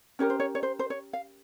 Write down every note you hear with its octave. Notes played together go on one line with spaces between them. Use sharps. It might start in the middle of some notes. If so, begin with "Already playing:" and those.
C#4 G4 A#4 C#5
C5
C#5
C#5
C5
C5
C#5
F5